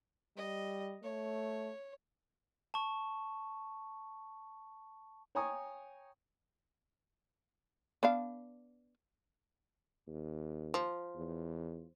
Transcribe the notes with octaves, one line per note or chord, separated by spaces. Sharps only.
G3 D#5
A3 C#5
A5 C#6
C#5 G5 G#5 A#5 C#6 D#6
B3 D4 F5
D#2
F3
E2